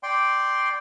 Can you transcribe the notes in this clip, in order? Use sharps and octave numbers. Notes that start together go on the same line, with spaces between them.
D5 G5 C6